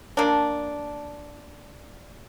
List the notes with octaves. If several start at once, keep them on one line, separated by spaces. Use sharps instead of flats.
A#3 D4